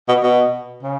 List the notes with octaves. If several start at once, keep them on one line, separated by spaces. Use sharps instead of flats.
B2
B2
C#3